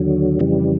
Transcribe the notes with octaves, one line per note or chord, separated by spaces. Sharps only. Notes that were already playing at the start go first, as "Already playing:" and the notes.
Already playing: D#2 D3 F#3
F2 C#3 E3 G3